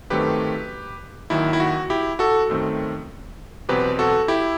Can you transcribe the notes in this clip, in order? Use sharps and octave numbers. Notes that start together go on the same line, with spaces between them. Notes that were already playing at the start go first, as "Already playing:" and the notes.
F#2 D#3 F#3 A3 C4 G4 B4
D#2 D#3 F#3 E4
E4
F#4
E4 G4
F#4 A4
F#2 D#3 A3 C4
E2 B2 F#3 C4 G4 B4
F#4 A4
E4 G4